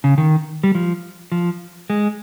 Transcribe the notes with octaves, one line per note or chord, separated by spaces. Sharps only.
C#3
D#3
G3
F3
F3
G#3